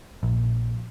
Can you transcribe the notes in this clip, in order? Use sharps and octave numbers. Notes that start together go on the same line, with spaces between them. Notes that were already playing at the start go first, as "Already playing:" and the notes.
A#1